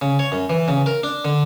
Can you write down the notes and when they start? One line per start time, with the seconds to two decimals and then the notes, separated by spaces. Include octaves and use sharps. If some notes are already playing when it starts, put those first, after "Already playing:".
0.01 C#3
0.19 C#5
0.32 F#2
0.50 E3
0.68 C#3
0.86 A#4
1.03 D4
1.25 D3